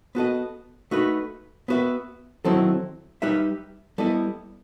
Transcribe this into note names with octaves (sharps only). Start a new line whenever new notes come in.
B3 F#4 A4 D#5
A3 D#4 F#4 B4
B3 F#4 B4 E5
D#3 F#3 C4 E4 A4
G3 D#4 G4 B4 E5
G3 B3 E4 A4 D#5